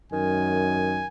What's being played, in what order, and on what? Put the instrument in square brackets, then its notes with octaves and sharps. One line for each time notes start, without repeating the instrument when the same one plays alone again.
[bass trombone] F#2 [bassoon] D#3 [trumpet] G#5